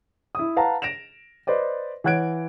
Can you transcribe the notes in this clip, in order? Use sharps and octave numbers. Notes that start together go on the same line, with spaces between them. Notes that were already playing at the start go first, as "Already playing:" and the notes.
E4 D#6
B4 F5 F#5 A5 A#5
A#6 D7 E7 F7
B4 C5 D5 D#5
E3 C#5 F#5 F#6 G#6 D7